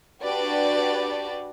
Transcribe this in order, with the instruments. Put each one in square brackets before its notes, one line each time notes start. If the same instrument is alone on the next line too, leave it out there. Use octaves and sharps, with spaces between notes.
[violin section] D4 F#4 G4 B4 D5